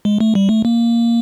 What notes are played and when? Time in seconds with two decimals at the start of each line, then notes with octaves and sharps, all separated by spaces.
0.05 G#3
0.20 A3
0.35 G3
0.49 A3
0.65 A#3